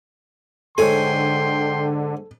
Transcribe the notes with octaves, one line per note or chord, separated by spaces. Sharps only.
G#2 D3 A4 C#5 G5 G#5 C6